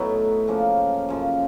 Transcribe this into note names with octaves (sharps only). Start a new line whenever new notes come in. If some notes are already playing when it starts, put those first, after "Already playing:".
Already playing: A2 F#3 B3 D#4
C#3 F3 A#3
F#2 C#3 F3